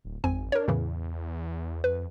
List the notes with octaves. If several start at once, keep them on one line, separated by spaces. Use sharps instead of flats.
D1
G#1 F2 C4 G#5
D4 A#4 C#5
E2 A2 C#3 E3
F2 B4